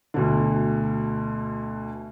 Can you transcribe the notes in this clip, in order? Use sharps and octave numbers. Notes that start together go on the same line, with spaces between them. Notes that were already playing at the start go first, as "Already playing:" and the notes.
D2 B2 D3